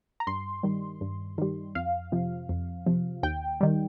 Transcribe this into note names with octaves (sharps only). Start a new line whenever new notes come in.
A#5
G2 C6
D#3 G3
G2
D#3 G3
F2 F5
C3 F3
F2
C3 F3
D#2 G5
D#3 G3